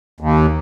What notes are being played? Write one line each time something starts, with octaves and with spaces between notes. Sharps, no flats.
D#2